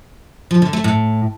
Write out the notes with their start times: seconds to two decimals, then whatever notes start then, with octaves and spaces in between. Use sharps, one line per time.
0.51 F3
0.62 D3
0.73 A3
0.84 A2